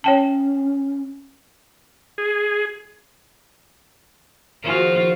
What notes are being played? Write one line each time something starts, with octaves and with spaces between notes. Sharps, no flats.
C#4 C#5 G5 A5
G#4
D#3 F3 F4 F#4 G#4